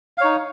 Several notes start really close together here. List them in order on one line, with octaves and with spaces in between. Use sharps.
F5 C#5 D#4